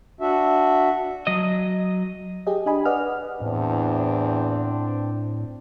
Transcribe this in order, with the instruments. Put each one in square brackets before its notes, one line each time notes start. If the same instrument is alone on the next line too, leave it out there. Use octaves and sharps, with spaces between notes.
[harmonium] D4 F#4 E5
[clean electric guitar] F#3 D#5
[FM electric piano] G4 G#4 D#5
D4 D#5 G#5 B5
B4 D5 D#5 F#5 F6
[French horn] E2 [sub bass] A2 [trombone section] C4 D4